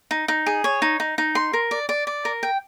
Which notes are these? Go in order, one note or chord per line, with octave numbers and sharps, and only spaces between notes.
D#4
D#4
G#4
C#5
D#4
D#4
D#4
C6
A#4
D5
D5
D5
A#4
G5